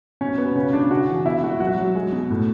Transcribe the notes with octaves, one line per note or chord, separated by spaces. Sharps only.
B2 C#4
B2 B3
C#3 C#4
C#3 D4
C#3 F#4
E3
B2 E4
G#3 F#4
F#3 F#4
F#3
G#3
B2
A2